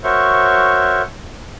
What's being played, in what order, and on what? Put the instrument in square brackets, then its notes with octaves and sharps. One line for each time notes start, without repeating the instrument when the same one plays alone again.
[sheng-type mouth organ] F#4 A#4 C5 C#5 E5 C#6